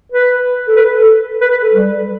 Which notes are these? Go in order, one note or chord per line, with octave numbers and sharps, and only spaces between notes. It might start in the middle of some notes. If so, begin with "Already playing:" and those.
B4
A4
B4
A4
B4
B4
A4
G3